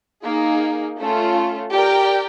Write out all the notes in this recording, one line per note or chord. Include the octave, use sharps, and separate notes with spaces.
A#3 D#4 G#4
A3 C#4 F4
G4 A#4 D5 G5